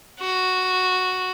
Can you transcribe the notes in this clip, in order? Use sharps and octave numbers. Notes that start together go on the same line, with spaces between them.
F#4